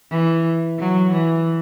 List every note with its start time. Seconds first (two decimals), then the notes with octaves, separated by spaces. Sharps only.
0.10 E3
0.78 F#3
1.12 E3